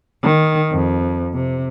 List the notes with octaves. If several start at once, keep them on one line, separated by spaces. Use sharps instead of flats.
D#3
F2
C3